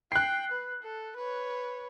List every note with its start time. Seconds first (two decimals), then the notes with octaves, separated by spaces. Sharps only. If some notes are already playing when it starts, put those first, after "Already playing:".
0.12 G5 F#6 C7
0.51 B4
0.83 A4
1.16 B4 C#5